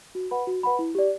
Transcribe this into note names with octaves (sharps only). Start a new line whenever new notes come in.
F#4
B4 F#5 B5
F#4
B4 F#5 B5
E4
G4 D5